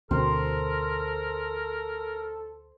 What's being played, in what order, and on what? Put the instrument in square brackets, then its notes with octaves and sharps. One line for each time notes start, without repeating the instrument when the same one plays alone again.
[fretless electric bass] D2 B2 C4 [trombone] A4 [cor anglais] A#4 [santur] C5